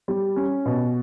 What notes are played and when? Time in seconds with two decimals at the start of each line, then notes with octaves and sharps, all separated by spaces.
0.08 G3
0.36 C#4
0.65 B2